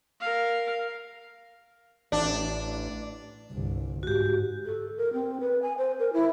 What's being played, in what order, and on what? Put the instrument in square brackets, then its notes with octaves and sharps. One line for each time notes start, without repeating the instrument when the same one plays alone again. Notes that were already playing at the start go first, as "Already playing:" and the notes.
[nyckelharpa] A#4 F5
[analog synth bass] A1 [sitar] D4
[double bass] G1 C2
[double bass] G#2 [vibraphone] F#4 G4
[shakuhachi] A4
A#4
C4
B4
G#5
C5
A#4
E4